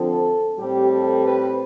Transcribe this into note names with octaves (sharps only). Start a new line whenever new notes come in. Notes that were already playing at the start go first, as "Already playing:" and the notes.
Already playing: D3 F3 C4 A4
A2 G3 C4 G4
A4
B4